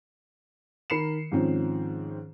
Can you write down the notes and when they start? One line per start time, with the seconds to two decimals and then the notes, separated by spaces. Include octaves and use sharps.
0.90 D#3 A#4 B5 C7 C#7 E7
1.32 G#2 D#3 F3 C4 C#4